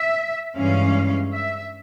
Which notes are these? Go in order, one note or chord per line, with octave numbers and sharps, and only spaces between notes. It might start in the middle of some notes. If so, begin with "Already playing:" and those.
Already playing: E5
G2 E3 G#3 C#4 F5
E5